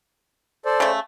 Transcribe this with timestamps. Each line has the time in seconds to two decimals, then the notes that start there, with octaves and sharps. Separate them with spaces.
0.65 A4 C5 D5
0.80 C#3 A3